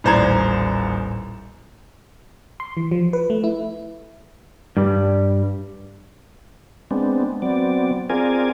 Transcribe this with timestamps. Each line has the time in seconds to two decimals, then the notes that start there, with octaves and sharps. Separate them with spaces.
0.04 D#1 A1 C5 D5 A#5 G#6
2.60 C6
2.77 E3
2.91 F3
3.13 B4
3.30 A3
3.44 E4
4.77 G2 G3
6.91 G#3 B3 C4 D4
7.42 F#3 B3 C4 D5
8.10 C4 F4 G#4 A#4 D5 G#5